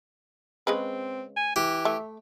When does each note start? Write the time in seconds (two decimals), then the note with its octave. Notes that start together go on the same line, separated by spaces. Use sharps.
0.67 C#3 G#3 C4 B4
1.37 G#5
1.56 E3 G4
1.85 A3 E5